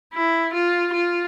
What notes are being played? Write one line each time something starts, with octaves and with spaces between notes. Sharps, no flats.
E4
F4
F4